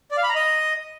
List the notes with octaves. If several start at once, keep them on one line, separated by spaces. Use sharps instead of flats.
D5
F5
B5
A#5
D#5